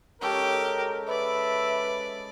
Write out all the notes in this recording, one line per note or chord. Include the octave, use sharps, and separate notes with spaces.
G#3 C#4 G4 A4 A#4
B4 D5 E5